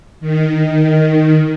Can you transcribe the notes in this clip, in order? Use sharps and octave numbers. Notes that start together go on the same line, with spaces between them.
D#3